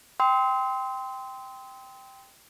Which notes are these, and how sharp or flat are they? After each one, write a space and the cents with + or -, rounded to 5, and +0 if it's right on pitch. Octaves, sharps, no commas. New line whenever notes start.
G5 +0 C6 -15 E6 -45